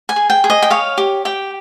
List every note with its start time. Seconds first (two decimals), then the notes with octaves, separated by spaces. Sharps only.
0.09 G#5
0.16 G#4
0.30 G5
0.44 G#4
0.50 D#5
0.62 G5
0.70 C#5 F5
0.98 G4
1.25 G4 G5